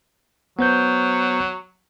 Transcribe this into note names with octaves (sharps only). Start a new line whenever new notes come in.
F#3 B3 C5 G6